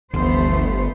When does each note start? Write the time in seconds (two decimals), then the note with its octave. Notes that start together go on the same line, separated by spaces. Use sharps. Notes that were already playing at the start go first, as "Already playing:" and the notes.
0.14 G1 D2 E3 F3 A3 B3 C5